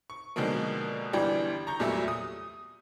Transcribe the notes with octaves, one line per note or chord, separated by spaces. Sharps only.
C#6
B2 D3 D#3 F3 G#3 A#3
G1 E3 G3 D4 G5
A#5 C#6 G6
E2 A#2 F#3 G3 A3 E5
D#6